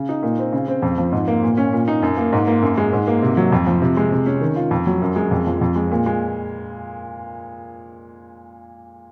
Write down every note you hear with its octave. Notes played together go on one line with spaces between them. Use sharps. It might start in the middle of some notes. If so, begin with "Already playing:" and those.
Already playing: C#3
D#4
A#2
C4
C#3
C4
F2
F3
G#2
A#3
A#2
C#4
A#2
D#4
F#2
A#3
G#2
A#3
F#2
G#3
G#2
A#3
C3
F#3
F2
F3
C3
G#3
C3
C#4
D#3
F4
F2
F#3
F#2
G#3
F2
F3
F2
G#3
A#2
G#3